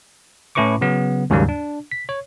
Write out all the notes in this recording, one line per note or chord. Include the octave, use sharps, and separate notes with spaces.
A2 C#4 E4 B4 C#6 D6
C#3 F#3 B3
D#2 G#2 C#3 F#3 G3 A#3
D4
B6
C#5